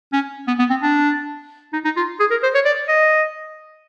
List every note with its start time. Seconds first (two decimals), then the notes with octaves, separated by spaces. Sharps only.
0.13 C#4
0.48 B3
0.59 B3
0.70 C4
0.82 D4
1.73 D#4
1.85 D#4
1.97 F4
2.20 G#4
2.31 A#4
2.43 C5
2.55 C#5
2.65 D5
2.88 D#5